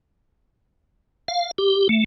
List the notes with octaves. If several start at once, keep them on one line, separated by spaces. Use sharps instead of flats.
F5
G4
A3